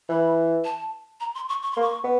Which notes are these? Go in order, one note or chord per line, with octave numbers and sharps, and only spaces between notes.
E3 B5
A5
A#5
C6
C#6
C#6
C6
A#3
C#6
B3